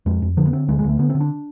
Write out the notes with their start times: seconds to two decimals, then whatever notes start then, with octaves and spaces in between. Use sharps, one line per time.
0.06 F2 G#3
0.22 F2
0.37 D3 F3
0.47 B3
0.53 D3 C4
0.68 D2 G#3
0.79 G#3
0.84 D2
0.89 A3
0.99 D3 B3
1.10 C4
1.15 D3
1.20 D4